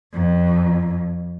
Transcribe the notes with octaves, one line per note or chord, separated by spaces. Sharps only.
F2